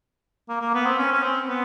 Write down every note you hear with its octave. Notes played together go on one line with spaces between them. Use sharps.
A#3
A#3
B3
C4
C#4
C#4
C4
B3